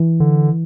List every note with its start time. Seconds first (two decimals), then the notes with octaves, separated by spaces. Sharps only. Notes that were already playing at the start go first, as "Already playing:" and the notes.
Already playing: E3
0.20 D3